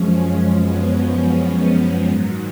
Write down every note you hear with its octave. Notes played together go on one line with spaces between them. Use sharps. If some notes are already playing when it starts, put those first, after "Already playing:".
Already playing: F#2 F3 G#3 C#4
B3
G#2 D#3 F#3